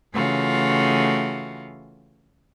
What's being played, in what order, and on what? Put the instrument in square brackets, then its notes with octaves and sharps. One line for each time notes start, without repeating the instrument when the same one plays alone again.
[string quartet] C#3 E3 A3 F4 F#4